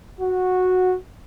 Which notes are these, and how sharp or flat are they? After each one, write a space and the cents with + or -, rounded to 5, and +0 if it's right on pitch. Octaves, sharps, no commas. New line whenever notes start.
F#4 -10